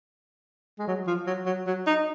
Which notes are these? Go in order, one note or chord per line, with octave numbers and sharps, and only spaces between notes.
G#3
F#3
F3
F#3
F#3
F#3
D#4